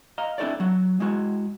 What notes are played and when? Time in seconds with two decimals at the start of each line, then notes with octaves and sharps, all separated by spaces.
0.18 D#5 F5 A#5
0.38 C4 D4 E4 A4 C#5 D5
0.60 F#3 F#4 F#5
1.00 G#3 E4 F#4